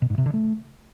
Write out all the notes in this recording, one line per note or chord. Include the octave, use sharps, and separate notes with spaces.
B2
G#2
C3
D3
A3